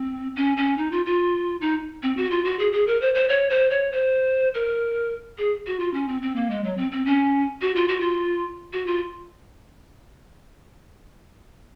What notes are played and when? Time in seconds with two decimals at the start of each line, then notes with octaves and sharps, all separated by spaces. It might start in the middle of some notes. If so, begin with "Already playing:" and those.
Already playing: C4
0.36 C#4
0.57 C#4
0.78 D#4
0.92 F4
1.06 F4
1.61 D#4
2.03 C4
2.17 F#4
2.31 F4
2.45 F#4
2.59 G#4
2.73 G#4
2.87 A#4
3.02 C5
3.15 C5
3.29 C#5
3.50 C5
3.70 C#5
3.92 C5
4.54 A#4
5.38 G#4
5.67 F#4
5.80 F4
5.94 C#4
6.08 C4
6.22 C4
6.36 A#3
6.50 G#3
6.64 F#3
6.77 C4
6.92 C4
7.06 C#4
7.61 F#4
7.76 F4
7.88 F#4
8.00 F4
8.73 F#4
8.87 F4